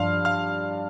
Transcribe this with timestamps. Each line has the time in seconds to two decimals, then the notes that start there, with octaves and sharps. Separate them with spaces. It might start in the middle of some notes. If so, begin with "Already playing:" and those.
Already playing: G2 F3 D4 F5 C6 F6
0.25 F5 F6